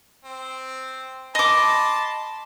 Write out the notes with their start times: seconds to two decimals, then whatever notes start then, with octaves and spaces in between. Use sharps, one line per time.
0.24 C4
1.35 D#5 A5 B5 C6 D6